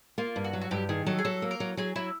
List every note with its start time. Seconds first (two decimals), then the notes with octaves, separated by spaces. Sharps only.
0.18 A#3 F4
0.36 G2
0.44 F#4
0.53 F#3
0.62 F#4
0.71 G2 G4
0.89 D#3 G#4
1.06 F#3 A4
1.19 G#4
1.25 F#3 A4
1.42 A#3
1.51 A#4
1.60 F#3
1.77 F#3 G#4
1.96 F#3 E4